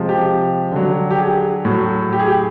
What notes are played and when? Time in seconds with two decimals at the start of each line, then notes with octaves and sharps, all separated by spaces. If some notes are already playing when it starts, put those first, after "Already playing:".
Already playing: C3 F3 G#3
0.09 G4
0.72 D3 F#3
1.11 G4
1.18 G#4
1.65 A2 F#3
2.13 G4
2.19 G#4
2.27 G4